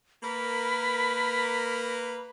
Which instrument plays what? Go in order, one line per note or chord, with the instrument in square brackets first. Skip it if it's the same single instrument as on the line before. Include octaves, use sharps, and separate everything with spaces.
[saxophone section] A#3 A#4 B4 [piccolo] B5